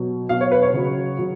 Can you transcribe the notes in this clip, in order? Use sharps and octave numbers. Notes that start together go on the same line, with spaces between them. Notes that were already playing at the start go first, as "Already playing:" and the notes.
Already playing: B2 F#3
B2 F#3 F5
C#5
B4
C#5
C#3 F#3
C#3 F#3